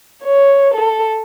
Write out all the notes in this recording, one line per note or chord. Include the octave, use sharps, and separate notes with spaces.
C#5
A4